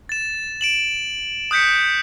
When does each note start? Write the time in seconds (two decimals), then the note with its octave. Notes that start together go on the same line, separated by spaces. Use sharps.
0.09 A6 E7
0.61 D7 E7 F#7
1.51 D#6 F#6 G6 B6 C#7